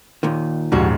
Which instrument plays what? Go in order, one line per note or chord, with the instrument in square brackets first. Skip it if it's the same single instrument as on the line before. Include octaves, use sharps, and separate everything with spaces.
[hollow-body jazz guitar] D#2 A#2 D#3
[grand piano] D#1 G#2 [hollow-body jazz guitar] F2 G3 F#4